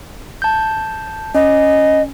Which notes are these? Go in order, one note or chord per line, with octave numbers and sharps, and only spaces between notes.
A5 G6
C#4 D#5